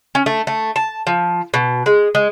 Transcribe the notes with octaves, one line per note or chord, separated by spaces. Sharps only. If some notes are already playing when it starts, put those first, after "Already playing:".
C#4
A3
A3
A5
F3
B2
G#3
G#3